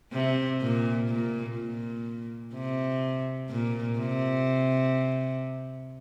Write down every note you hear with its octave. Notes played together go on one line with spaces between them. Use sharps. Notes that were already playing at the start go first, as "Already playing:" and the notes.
C3
A#2
A#2
A#2
C3
A#2
C3